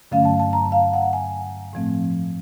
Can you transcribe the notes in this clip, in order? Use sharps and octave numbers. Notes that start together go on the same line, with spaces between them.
G2 D3 F#3 A3 C#4 F5
A5
A5
A#5
F5
F#5
G#5
A2 F3 A3 C4